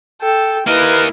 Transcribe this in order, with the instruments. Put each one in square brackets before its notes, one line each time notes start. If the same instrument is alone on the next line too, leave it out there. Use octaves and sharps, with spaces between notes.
[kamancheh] A4 G5
[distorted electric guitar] A#3 D#5 [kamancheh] E4 [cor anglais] A#4 [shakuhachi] B4